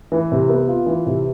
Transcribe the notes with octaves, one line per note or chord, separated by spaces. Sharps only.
E3
C3
B3
F4
E3
C3